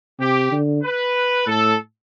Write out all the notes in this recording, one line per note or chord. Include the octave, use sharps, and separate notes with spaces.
C3 G4
D3
B4
A2 A4